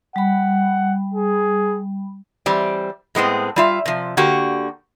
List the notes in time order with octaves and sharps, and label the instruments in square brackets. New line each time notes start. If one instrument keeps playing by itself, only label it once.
[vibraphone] G3 B5 [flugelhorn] F#5
[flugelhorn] G#4
[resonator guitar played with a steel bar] E3 G3 C4 D5
A2 G#3 B3 C4
G3 F4 E5
C3 F3
D3 A#3 F#4 G4